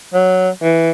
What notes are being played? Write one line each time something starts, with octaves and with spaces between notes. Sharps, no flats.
F#3
E3